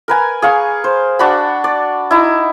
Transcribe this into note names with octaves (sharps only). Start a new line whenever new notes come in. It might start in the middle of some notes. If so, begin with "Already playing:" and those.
A#4 B4 G#5
G#4 F5 C#6
C5
D4 F#4 A5 B5
D5
D#4 E4